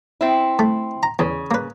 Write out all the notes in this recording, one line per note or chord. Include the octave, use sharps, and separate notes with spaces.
C4 E4
A3
A#5
E2 C#3
A#3 B4